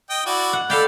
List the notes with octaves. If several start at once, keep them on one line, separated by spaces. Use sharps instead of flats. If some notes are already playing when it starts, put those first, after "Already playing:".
D#5 G5
E4 F#4 D5
F#5
A4 D5 F5 G5 B5